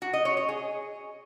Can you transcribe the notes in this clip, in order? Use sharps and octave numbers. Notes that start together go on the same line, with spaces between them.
F#4
D#5
C#5
C#5
G#4